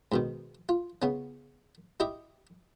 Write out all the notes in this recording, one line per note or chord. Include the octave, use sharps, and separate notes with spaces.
G#2 B2 D#3
F4
C#3 B3 C#4
E4 G4 D#5 E5